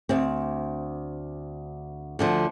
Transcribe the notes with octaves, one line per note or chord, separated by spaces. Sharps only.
D2 C4
D2 D3 F3